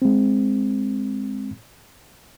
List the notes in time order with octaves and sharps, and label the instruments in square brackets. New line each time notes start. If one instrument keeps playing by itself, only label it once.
[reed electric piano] G#3 C4